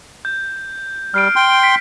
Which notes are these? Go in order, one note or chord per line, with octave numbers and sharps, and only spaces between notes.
G6
G3 F6 C7 D7
G5 C6
B6